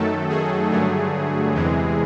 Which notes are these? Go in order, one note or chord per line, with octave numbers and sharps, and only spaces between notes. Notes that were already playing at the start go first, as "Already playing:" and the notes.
Already playing: F#2 D#3 F#3 A3 A4
G#4
G2 D3 F#3 A3
E2 C3 E3 G#3